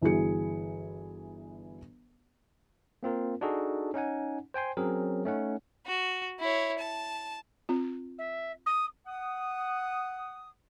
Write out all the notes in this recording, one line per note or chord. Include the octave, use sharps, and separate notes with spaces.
G1 E3 E4 F#4 G#4 C#7
A#3 C4 F4 A#4
D4 D#4 F#4 G#4 A4
C#4 D#4 F#5 G#5
C5 G5 G#5 C6
F#3 C4 C#4 G#4 A#4
A3 C#4 D#4 F#5
F#4
E4 C#5
A5
C4 F4
E5
D#6
F#5 D#6